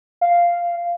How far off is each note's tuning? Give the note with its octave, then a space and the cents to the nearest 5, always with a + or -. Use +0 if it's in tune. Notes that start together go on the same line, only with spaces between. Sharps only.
F5 -10